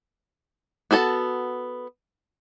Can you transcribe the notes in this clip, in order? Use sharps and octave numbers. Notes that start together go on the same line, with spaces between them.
B3 F#4 A4 G#5 A5